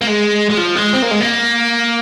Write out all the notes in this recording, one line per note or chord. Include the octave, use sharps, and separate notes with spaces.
A#3
G#3
G#3
F3
G#3
C4
A#3
G#3
A#3